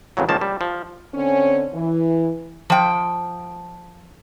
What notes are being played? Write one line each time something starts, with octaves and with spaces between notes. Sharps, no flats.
A1 F2 C#3 F#3
C#2 D#3 F3 A#3 A5
G3
F3
D3 C4 C#4
E3
F3 G5